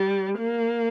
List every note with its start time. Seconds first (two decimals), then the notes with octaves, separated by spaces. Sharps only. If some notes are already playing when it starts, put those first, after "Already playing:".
Already playing: G3
0.38 A#3